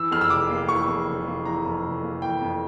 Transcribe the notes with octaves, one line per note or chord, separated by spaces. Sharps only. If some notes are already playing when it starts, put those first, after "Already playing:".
Already playing: E3 E6
F2 F6
E6
F1 D6
A#3
E3 C#6
F2
F1
A#3
E3 A#5
F2
F1
A#3
E3 G5
F2